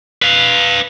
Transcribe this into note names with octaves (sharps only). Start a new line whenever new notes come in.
B4 F5